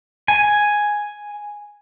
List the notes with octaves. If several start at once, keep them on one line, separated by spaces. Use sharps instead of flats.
G#5